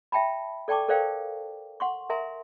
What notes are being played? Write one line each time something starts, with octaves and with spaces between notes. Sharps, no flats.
E5 G5 A5 B5
A4 D5 G5 A5 C#6 D6
A4 A#4 C5 D5 F5 G5
F#5 C6 C#6
A#4 E5 G#5 A#5 C6